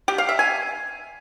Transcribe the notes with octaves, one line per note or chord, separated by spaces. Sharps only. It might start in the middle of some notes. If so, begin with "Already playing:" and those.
G4
F5
E5
G#5